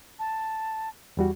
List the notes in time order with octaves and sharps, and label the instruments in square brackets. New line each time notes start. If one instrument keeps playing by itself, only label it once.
[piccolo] A5
[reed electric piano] E2 G3 F#4